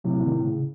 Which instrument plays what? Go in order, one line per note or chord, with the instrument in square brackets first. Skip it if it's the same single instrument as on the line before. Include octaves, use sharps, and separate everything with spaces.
[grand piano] A2 C3 [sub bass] F#3
[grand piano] A2 C3
[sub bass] D#3
[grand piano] A2
[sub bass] C#3